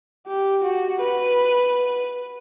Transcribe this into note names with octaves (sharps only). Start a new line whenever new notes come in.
G4
F#4
B4